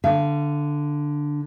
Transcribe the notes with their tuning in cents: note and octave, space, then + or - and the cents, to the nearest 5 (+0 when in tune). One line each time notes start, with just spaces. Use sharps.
D3 +0 F5 -40